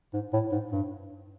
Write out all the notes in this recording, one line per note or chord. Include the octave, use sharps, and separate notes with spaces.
G#2
A2
G#2
G2